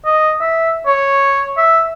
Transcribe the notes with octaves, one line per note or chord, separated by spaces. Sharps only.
D#5
E5
C#5
E5